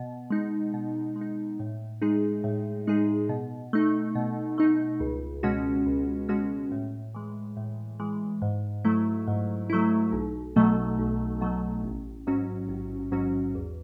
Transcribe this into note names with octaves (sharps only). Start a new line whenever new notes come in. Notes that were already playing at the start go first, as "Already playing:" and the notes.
Already playing: B2
G#3 D#4
B2
G#3
D#4
A2
G#3 D#4 G#4
A2
G#3 D#4 G#4
B2
A3 D#4
B2
A3 D#4
C#2
B2 G#3 C#4 F#4
C#2
B2 G#3 C#4 F#4
A2
E3 G#3
A2
E3 G#3
G#2
F#3 A3 E4
G#2
F#3 A3 E4
B1
B2 F#3 A3
B1
B2 F#3 A3
A1
G#2 F#3 C#4 F#4
A1
G#2 F#3 C#4 F#4
E2